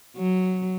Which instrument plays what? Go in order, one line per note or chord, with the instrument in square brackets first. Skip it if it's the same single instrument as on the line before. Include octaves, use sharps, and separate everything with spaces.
[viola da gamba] F#3